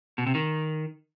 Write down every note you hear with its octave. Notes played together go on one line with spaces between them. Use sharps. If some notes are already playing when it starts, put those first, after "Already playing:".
B2
C3
D#3